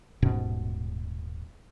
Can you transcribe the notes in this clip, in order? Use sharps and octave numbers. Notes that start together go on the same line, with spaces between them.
D#1 G#2 B2 C#4